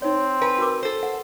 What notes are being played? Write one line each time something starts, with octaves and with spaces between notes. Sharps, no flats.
C4 D#4 C#5
B4 G#5
F#4 A#4 D6
A4 C5
F#5